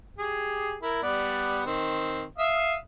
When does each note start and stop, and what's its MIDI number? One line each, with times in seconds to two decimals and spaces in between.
0.18 0.76 67
0.18 0.76 68
0.82 1.02 64
0.82 1.02 70
1.02 1.61 55
1.02 1.61 59
1.02 1.61 74
1.66 2.24 51
1.66 2.24 60
2.38 2.75 76
2.38 2.75 77
2.38 2.75 87